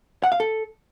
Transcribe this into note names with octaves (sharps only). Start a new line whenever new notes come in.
F#5
F5
A4